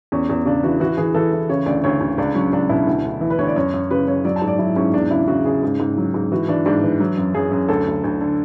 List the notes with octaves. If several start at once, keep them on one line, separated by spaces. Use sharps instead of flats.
E2 C#4
E2
C#3 D4
E3 F#4
E3 F#4
E3 G#4
E3 A4
E3
C#3 C#5
D2 D5
D2 C#5
D2
C#2 D4
F#3 C#4
C#2 D4
B2 E4
D2
D2
E3
B4
D2 C#5
D5
F#2 C#5
F#2
C#3 B4
F#2 C#5
F#3 D5
A5
G#2
D5
F#3 E4
G#2 C#4
E2 D4
C#3 E4
C#3 F#4
C#3 G#4
G#2
G#2
F#3
G#2
E3 F#4
E3 D4
G#2 D4
E3
F#3
F#2
F#2 G#4
F#2
D2 A4
D2
D2
D3